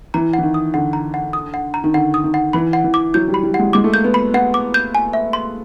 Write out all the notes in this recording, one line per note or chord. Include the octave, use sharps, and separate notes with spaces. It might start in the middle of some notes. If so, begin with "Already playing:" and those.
E3 A#5
E3 F#5
D#3
D#6
D3 F#5
A#5
F#5
D#6
F#5
A#5
D#3
D3 F#5
D#6
D#3
F#5
E3 B5
F#5
E3
D6
F#3 G6
G3
B5
G3
F#5
G#3
G#3 D6
A3
A#3 G6
B3
B5
B3 F#5
D6
G6
G#5
E5
C6